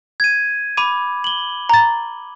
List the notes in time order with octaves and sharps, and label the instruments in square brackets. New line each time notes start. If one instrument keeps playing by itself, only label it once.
[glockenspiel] G#6 D#7
[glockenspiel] B5 D6 [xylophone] D#7
[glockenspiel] F#7 G7
[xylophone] A#5 A6